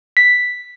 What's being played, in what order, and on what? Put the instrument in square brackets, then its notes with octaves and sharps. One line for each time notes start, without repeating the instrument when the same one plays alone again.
[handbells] B6